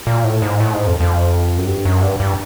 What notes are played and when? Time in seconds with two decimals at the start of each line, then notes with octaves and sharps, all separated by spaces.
0.07 A#2
0.24 A2
0.42 G#2
0.60 A2
0.73 G#2
0.87 F2
1.00 F2
1.58 F#2
1.67 G2
1.85 F#2
2.02 G2
2.20 G2